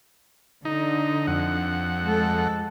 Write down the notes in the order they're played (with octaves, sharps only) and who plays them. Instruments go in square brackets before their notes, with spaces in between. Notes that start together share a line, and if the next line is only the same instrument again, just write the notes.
[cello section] D3 [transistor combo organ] D#4
[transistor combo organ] F2 F#5
[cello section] G#3 A4